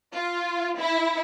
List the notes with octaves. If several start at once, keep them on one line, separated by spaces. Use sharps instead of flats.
F4
E4